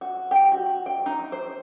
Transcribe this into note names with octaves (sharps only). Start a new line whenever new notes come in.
F#4
G4
F#4
G5
D#4
C5